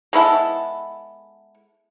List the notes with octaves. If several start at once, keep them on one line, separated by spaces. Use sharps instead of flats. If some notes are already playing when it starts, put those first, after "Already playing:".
G#3 B3 E4 A4